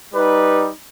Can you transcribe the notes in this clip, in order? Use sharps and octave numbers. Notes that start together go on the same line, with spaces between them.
G3 D#4 B4